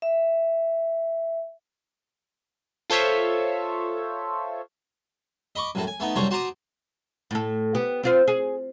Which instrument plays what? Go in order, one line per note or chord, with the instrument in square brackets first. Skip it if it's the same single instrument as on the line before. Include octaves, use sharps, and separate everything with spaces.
[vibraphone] E5
[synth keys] F4 A4 C5 C#5 E5
[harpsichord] D#5 B5 C#6 D6
F#2 A2 A4
G#5
A3 B3 D#4
C2 F#2 A4 C5 C#5 A#5
F#4 C5 A5 A#5 D6 D#6
[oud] A2 A4
B3 G4
C4 F4 C5
G#4